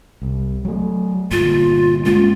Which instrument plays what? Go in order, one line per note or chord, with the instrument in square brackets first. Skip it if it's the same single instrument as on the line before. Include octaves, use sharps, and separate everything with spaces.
[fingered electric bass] C2
F#3 A3
[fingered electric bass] G1 A#2 [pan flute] F4
[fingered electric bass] G#3 A#3 C#4 [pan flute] F4